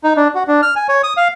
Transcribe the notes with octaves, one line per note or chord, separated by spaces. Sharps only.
D#4
D4
F#4
D4
F6
G#5
C#5
D#6
F5